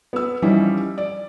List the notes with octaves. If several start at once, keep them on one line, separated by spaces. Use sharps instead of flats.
B3 E6
E3 F3 G3 C#4 D#4 E4
D5